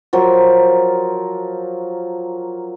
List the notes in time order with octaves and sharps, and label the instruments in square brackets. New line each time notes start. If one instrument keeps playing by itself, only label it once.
[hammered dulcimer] F3 F#3 A#4